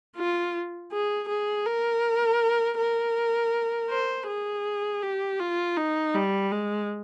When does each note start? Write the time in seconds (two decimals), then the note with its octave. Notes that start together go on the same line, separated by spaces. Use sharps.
0.17 F4
0.92 G#4
1.29 G#4
1.66 A#4
2.78 A#4
3.90 C5
4.27 G#4
5.03 G4
5.40 F4
5.77 D#4
6.14 G3
6.52 G#3